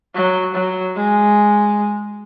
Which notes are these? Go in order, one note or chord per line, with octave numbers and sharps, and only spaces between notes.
F#3
F#3
G#3